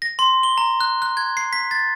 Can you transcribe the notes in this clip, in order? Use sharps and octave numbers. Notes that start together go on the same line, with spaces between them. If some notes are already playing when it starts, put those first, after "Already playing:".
A#6
C6
G7
A#5
F#6
F#6
G#6
C7
B6
A6